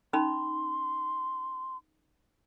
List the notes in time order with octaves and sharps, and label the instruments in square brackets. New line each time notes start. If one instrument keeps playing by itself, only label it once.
[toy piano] C#4 D#4 B5 [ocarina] C6